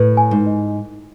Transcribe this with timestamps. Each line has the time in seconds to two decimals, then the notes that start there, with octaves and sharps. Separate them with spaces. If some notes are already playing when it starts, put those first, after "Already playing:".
Already playing: A2 B4
0.17 G#5
0.31 G#2
0.47 D#5